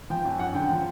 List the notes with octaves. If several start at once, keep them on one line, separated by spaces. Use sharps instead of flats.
F3 G5
F#2
F#2 F#5
D3 G5
F3